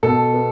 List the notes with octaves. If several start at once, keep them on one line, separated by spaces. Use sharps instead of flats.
B2 A4
B3